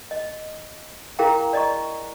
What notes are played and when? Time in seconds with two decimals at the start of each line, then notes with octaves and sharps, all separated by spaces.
0.11 D#5
1.19 E4 G#4 A#4 F5 G5 A#5
1.53 D5 D#5 A#5 C#6